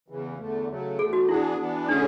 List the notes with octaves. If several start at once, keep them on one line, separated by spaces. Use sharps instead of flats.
E2 C#3 E3
E2 D3 A3
C#3 F#3 A3
E2 B2 A3 G#4
F#4
E3 B3 D4 E4 G#4
E3 B3 D4
D3 A3 C#4 D4 G#4